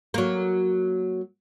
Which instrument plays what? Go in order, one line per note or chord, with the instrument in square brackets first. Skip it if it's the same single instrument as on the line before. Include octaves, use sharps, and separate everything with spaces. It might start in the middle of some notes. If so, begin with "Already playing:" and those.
[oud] F#3 A#3